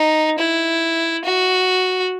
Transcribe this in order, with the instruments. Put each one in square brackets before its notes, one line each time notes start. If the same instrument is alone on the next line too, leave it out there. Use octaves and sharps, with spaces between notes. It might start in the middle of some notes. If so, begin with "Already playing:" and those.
Already playing: [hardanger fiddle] D#4
E4
F#4